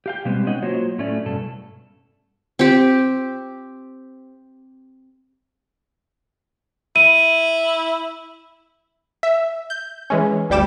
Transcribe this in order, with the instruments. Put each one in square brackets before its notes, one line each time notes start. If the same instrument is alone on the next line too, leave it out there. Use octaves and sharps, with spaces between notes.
[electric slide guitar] G4 F5 G5
B2 G3 G#3 B3 C4 G4
C#4 D#4 D#5 F#5 G5
F#3 A#3 F4 F#4 C5 C#5
A2 A3 C#4 D5
G2 B2 A4
[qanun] C4 G4
[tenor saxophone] E4 [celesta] D#7
[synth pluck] E5
G6
E3 G#3 C#4
G1 D2 G3 G5 D6 E7